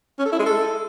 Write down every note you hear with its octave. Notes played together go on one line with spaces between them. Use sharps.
C#4
A4
E4
G#3
A4